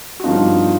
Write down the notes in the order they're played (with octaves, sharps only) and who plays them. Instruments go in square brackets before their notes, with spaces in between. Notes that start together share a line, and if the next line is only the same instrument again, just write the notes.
[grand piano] F#4
G2 D3 F3 D#4 F4